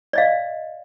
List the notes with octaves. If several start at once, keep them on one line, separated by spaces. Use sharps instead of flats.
D5 D#5 F5